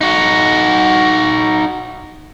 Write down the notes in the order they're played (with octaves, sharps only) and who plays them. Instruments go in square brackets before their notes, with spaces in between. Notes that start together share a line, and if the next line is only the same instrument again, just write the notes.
[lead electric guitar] D#4 F#4